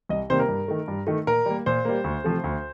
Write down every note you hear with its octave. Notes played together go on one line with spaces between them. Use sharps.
C2 D#5
C3 D#3 G3 A#3 C5
A#4
G2
D#3 A3
G2
D#3 A3
A#2 A#4
G3 A#3
A#2 C5
G3 A#3
D2
C3 F3 A3
D2